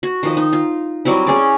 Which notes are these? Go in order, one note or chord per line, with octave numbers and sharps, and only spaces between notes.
F#4
D#3 F3 D#5
D#4
F4
F#3 G3 C4 E4
C#4 G#4 D5